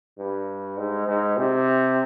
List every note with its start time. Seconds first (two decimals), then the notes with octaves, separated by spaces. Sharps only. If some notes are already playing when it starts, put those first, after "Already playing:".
0.18 G2
0.78 G#2
1.08 G#2
1.37 C3